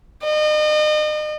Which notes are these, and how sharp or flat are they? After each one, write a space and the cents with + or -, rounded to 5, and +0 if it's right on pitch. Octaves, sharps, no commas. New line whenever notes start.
D#5 -35